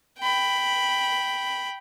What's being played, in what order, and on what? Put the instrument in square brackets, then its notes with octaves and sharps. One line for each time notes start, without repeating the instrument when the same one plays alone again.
[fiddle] G5 B5